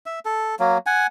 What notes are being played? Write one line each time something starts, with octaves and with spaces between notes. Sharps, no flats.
E5
A4
F#3 A#3
F#5 G#5